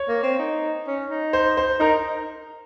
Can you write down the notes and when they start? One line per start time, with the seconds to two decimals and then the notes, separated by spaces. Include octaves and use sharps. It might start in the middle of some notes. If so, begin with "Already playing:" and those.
Already playing: C#5
0.08 A#3
0.23 C4
0.39 D#4
0.87 C#4
1.10 D#4
1.33 C5
1.57 C5
1.80 D#4 A#4